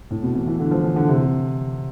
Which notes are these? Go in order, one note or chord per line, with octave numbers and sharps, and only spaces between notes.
A2
B2
E3
E3
D3
F3
E3
D3
C3